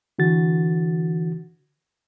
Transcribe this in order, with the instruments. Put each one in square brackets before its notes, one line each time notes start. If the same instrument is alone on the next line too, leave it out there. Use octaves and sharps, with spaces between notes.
[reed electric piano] D3 E3 F#4 A6